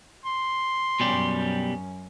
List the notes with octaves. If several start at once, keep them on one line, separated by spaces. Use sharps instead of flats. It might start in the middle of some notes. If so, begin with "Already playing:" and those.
C6
F#2 B2 G3 C#4 G4